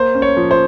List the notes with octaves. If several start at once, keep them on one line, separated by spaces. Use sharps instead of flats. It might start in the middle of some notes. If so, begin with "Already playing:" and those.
Already playing: A#3 C5
C#4
C#5
F3
C5